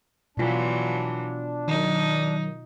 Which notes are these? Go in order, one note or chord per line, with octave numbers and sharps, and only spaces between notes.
B2 E3 F#3 D4 F4
D#3 F#3 D#4